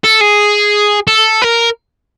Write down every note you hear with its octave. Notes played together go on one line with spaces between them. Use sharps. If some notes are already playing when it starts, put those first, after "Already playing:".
A4
G#4
A4
A#4